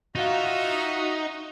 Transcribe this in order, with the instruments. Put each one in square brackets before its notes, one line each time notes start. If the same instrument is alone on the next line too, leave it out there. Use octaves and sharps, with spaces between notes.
[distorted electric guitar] D#4 [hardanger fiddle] F4 E5 [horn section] F#4